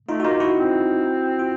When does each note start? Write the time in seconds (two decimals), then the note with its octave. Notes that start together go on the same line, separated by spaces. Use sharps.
0.09 A3 D#4 F4
0.20 F#4
0.24 A#3 D#4 F4
0.40 E4 F#4
0.56 C4
1.39 F4